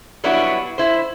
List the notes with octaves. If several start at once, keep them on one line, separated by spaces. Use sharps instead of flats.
F#3 G3 B3 D4 E4 F#4
E4 C5